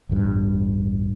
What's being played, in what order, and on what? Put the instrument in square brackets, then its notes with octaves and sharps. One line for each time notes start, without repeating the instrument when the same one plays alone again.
[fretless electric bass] A1 E2 G2